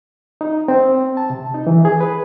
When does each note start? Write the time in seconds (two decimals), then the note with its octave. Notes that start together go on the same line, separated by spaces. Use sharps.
0.41 D#4
0.68 C4
1.17 A5
1.30 C3
1.54 D#4
1.67 E3
1.85 G#4
2.00 B4